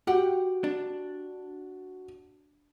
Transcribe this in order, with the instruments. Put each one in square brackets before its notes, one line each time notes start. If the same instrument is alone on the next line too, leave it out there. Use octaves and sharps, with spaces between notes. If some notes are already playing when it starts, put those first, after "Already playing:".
[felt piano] F#4 [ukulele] G4 F#5 G5
[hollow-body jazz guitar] D4